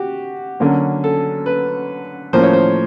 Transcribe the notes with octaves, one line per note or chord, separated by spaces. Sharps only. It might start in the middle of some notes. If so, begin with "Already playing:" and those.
Already playing: F#4 G4
D3 F#3 A#3 C#4
A4
B4
A2 F3 A#3 C#4 C5
C#5
C5